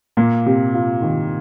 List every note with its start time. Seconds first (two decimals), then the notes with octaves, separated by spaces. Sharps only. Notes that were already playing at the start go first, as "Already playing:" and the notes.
0.17 A#2 A#3
0.46 C3
0.74 F4
1.02 D#3